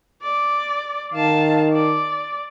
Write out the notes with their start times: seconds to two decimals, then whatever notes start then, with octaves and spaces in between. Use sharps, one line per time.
0.23 D5
1.13 D#3 F5 A5
1.73 D5